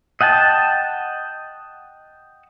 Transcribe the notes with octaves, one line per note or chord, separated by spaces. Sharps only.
D#5 F#5 G5 A5